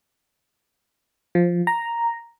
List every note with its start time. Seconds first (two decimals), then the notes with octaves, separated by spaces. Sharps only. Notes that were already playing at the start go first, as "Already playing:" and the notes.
1.35 F3
1.67 A#5